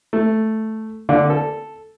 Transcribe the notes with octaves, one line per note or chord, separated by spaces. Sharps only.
A3
D3
A4